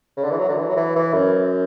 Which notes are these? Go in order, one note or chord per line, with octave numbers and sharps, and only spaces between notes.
C#3
D3
E3
F#3
D3
E3
F#3
E3
E3
F#2